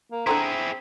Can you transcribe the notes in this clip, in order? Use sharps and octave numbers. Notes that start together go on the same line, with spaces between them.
A#3
C4 D4 E4 G#4 A4 C5 A#5